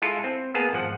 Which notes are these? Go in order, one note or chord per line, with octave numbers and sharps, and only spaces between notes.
G#3 E4 F4 A4
C4
A#3 B3 G#4 A5
G#1 F3 F#5